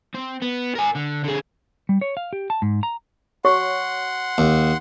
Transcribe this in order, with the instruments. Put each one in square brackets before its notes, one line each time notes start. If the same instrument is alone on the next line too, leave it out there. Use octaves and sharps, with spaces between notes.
[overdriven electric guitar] C4
B3
A#4 G#5
D3
D3 G#4
[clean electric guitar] G3
C#5
F5
G4
A5
G#2
A#5
[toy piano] F#4 C#5 C#6 [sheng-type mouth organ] F#5 C6
[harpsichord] D#2